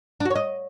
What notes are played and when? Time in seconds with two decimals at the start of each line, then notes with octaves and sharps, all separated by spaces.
0.20 D4
0.25 F#4
0.30 C#5
0.36 D#5